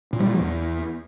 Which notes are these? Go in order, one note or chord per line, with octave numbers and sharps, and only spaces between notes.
A#2
G3
A#2
F3
E2